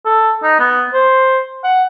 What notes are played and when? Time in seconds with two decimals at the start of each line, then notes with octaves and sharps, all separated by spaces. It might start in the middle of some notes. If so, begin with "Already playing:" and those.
0.06 A4
0.43 D#4
0.59 B3
0.93 C5
1.64 F#5